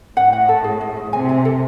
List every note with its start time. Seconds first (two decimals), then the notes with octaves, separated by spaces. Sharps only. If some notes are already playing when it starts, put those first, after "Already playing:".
0.16 A2 F#5
0.33 F#5
0.48 A4
0.64 G#4
0.81 G#4
0.96 G#4
1.13 C3 G#5
1.29 G#5
1.45 A4